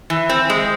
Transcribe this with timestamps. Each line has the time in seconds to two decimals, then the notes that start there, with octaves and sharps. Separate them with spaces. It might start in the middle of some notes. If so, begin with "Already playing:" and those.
0.10 E3
0.29 C4
0.50 G#3